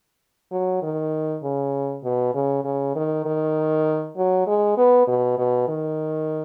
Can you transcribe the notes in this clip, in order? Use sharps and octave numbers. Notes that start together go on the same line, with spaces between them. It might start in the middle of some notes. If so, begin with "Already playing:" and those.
F#3
D#3
C#3
B2
C#3
C#3
D#3
D#3
F#3
G#3
B3
B2
B2
D#3